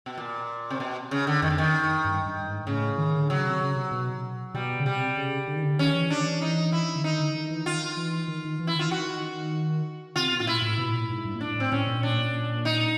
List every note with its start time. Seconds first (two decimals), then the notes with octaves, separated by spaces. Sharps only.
0.06 B2
0.18 A#2
0.71 C3
0.80 B2
1.11 C#3
1.27 D3
1.42 F2 D#3
1.50 D3
1.58 D#3
2.05 G2
2.26 G2
2.41 G2
2.46 G#2
2.67 A2 C#3
2.98 D#3
3.19 D3
3.30 C#3 F#3
3.45 C3
3.61 C#3
3.76 C3
3.91 B2
4.54 B2 G3
4.80 C#3
4.86 C3 G3
5.17 C#3
5.47 D3
5.56 D#3
5.63 D3
5.79 D#3 C#4
5.95 E3
6.10 D#3 D4
6.26 E3
6.42 D#4
6.72 E4
6.96 D3
7.03 D#3 D#4
7.20 D3
7.35 D#3
7.51 E3
7.66 D#3 F4
7.97 E3
8.28 D#3
8.45 D#3
8.59 E3
8.67 E4
8.76 D#3 F4
8.88 E3 F#4
8.99 D#3
10.16 C3 F4
10.32 B2
10.40 A2 F4
10.47 A#2 E4
10.62 A2
10.78 B2
10.89 A2
10.94 A#2
11.10 G#2
11.25 G2
11.35 A#2
11.40 A2 D4
11.56 A2 C4
11.72 A2 C#4
11.87 A#2
12.03 D4
12.65 D#4